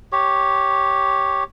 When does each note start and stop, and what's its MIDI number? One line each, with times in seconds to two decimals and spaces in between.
0.12 1.44 67
0.12 1.44 73